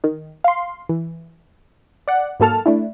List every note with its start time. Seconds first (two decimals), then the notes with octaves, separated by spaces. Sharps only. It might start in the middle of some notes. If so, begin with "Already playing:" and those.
0.04 D#3
0.44 F5 C6
0.89 E3
2.08 D5 F#5
2.40 G#2 F#3 A#3 A4 A5 F6
2.66 A3 D4 E4